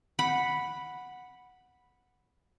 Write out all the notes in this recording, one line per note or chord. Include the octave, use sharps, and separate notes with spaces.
F#5 B5